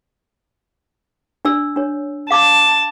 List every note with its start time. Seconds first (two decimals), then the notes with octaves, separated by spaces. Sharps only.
1.45 D4 D5 E6
1.76 D4 C#5
2.31 F5 A5 D6